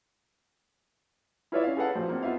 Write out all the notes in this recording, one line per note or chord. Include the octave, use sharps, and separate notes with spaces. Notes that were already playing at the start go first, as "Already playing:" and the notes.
E4 F4 B4 C#5 D5 E5
C#4 F5
G#4 A4 B4 F5 F#5 A5
A#1 F#4 C5
A#3 C4
B3 D#4 F4 E5 F5